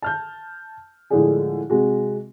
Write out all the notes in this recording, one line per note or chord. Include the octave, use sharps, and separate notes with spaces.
A5 F6 G6
A2 D3 F3 G#3 D4 G#4
C3 G#3 F#4